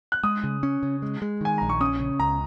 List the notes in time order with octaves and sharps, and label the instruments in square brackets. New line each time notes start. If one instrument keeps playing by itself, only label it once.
[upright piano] F#6
[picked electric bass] G#3 [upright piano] D#6
[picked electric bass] C#3
C#4
C#3
G#3
G#3
[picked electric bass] D#3 [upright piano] G#5
[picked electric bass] A#1 [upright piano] A#5
[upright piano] C#6
[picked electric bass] C#4 [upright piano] D#6
[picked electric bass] C#3
[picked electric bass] C#2 [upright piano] A#5